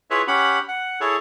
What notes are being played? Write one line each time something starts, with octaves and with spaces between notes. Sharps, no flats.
E4 F4 G#4 B4 C#5 E5
C#4 G4 F#5 B5
F#5
E4 G#4 A4 C#5